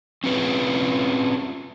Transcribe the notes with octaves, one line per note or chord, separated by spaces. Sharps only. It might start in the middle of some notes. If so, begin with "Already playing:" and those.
C4 C#4 F4 B4 C#5